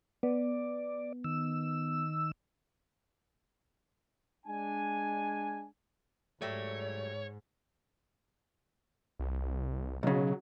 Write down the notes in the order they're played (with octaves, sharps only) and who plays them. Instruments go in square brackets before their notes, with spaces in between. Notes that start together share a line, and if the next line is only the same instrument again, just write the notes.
[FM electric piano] B3 [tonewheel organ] D5
[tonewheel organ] D#3 E6
[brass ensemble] G#3 D4 G#5
[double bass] G#2 [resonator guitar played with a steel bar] F#3 G3 A3 [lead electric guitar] C#5
[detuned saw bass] C2
[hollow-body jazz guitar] B1 C#3 [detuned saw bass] F#3